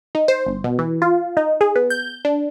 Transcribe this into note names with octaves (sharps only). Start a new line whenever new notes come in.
D#4
C5
G1
B2
E3
F4
D#4
G#4
B3
G6
D4